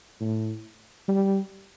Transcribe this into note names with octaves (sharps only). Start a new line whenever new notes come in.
A2
G3